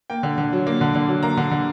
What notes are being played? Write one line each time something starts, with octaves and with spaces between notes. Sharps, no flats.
A#3 G5
D3
D3
F#3
A#3
D3
D3
F#3
A#3 A#5
D3
D3